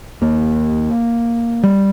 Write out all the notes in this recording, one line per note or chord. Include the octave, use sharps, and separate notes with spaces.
D#2 A#3
G3